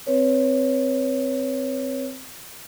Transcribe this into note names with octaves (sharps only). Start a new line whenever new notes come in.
C4 B4 C#5